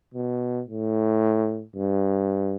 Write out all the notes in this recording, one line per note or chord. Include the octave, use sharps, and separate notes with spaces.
B2
A2
G2